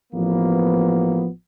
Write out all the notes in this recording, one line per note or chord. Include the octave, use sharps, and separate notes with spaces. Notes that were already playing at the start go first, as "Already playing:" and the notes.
A1 F3 A#3 B3